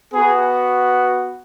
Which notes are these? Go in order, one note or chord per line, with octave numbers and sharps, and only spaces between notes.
B3 F#4 G#4